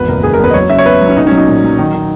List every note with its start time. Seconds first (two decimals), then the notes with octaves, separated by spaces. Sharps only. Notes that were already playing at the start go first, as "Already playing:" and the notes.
Already playing: G#1 E2 B4
0.08 F#1 A#4
0.23 F#1 G#4
0.34 A#4
0.39 E2 B4
0.50 D#5
0.54 F#3 C#5
0.69 C#3 E5
0.78 C#5
0.85 B3 B4
1.01 F#3
1.09 C#4
1.16 B1 D#4
1.27 F#3 C#4
1.37 D#4
1.47 A#2
1.63 F#3
1.78 D#3
1.94 D#3